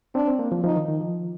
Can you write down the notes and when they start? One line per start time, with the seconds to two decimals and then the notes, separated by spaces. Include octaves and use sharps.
0.15 C4 D4
0.28 C4
0.39 A#3
0.52 F3
0.64 F3 D#4
0.76 D#3
0.89 D#3
1.01 F3